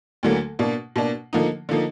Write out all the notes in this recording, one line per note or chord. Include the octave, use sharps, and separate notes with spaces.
D2 D3 F#3 A#3
B2 A#3 D4
B2 A#3 D4
D3 F3 A#3 D#4
D3 F3 A#3 D#4